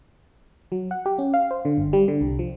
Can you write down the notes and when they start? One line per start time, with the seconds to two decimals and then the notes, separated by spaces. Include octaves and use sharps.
0.72 F#3
0.91 F#5
1.06 G4
1.18 C#4
1.34 F5
1.51 C5
1.65 D3
1.78 G1
1.93 G3
2.08 D3
2.21 C2
2.39 F3